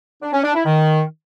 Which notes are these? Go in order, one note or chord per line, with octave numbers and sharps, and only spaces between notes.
D4
C#4
D4
E4
D#3